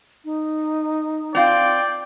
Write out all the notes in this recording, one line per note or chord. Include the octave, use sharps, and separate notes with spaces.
D#4
C4 F4 D5 G5